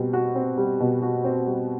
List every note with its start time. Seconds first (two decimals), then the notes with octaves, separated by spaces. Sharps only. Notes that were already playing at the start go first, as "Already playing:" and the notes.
Already playing: B2 G3 C4
0.13 F#4
0.36 C4
0.58 G3
0.80 B2
1.02 F#4
1.25 C4
1.47 G3